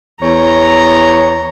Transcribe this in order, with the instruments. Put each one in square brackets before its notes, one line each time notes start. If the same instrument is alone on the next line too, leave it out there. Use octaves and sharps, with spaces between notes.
[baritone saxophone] E2 [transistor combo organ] C#5 [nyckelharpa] A#5